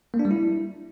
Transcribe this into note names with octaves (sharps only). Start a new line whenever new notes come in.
A#3
D4
G3
E4